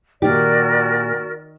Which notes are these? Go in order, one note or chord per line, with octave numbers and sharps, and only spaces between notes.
A#2 D#3 F#4 G4 A#4 D5